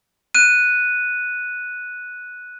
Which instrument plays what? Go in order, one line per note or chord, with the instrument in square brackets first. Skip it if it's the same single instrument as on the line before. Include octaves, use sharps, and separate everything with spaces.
[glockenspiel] F#6 D#7